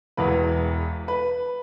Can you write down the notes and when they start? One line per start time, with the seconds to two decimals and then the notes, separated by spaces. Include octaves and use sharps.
0.17 E1 E2 E3 B4
1.08 B4